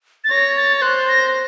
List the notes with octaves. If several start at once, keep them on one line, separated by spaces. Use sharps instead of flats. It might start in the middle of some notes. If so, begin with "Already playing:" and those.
A6
C#5 A#6
A6
A6
C5 F#6
A#6